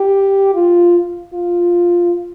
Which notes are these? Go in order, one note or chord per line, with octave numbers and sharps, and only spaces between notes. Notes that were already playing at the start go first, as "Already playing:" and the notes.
Already playing: G4
F4
F4